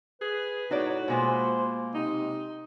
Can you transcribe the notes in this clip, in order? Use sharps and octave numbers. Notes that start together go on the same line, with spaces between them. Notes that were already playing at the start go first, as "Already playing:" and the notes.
G#4 B4
A2 D#4 F#4 C#5 D5
B2 G#3 A#3 F4 C5
C3 D#4